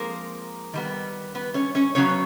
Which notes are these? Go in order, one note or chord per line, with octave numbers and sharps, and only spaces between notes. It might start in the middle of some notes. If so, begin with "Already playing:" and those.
Already playing: F3 G#3 A#3 C4 A#4
D#3 G3 B3
B3 B4
C#4 C#5
C#4 C#5
C#3 F#3 B3 C#4 C#5